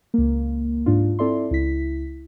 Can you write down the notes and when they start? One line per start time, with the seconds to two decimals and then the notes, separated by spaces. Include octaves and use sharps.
0.14 C#2 A#3
0.86 G#2 D4 F4
1.19 C4 E4 A4 D5 E5 C6
1.51 C#2 E4 B6